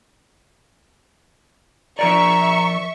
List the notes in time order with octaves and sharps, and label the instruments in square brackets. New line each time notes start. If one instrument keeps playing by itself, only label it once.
[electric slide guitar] F3 A#4 D5 [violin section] E5 C#6 [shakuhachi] A#5